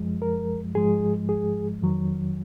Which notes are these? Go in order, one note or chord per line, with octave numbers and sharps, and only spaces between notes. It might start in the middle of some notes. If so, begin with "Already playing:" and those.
Already playing: F#2 F3 G#3
A#4
G#2 F3 G#3 G#4
G#4
F2 D#3 F#3